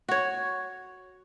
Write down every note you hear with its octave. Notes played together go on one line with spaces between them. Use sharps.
F#4 C#5